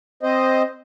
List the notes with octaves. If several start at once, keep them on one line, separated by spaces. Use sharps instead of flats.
C4 C5 D#5